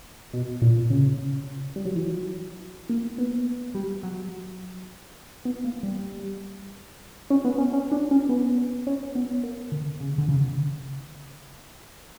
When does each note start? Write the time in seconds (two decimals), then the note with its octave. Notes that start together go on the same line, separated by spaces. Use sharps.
0.33 B2
0.62 A#2
0.90 C#3
1.76 G3
1.85 F#3
1.96 E3
2.05 F#3
2.89 A#3
3.18 B3
3.75 G3
4.03 F#3
5.45 B3
5.65 A#3
5.83 G3
7.30 C#4
7.45 B3
7.58 C#4
7.73 C#4
7.92 D4
8.11 C#4
8.29 B3
8.87 C#4
9.15 B3
9.43 A#3
9.72 D3
10.00 C#3
10.18 D3
10.29 C#3